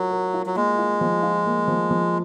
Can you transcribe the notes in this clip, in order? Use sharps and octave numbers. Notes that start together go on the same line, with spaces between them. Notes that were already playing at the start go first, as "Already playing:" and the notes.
Already playing: F#3 F4 A#4
A#4
F4
F#3
G#3 A#3
F4
F3
F4
A#3
F3
F3